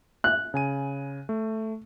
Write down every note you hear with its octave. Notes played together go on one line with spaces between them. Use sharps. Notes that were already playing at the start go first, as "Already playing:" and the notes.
F#6
C#3 G#5 D#7
A3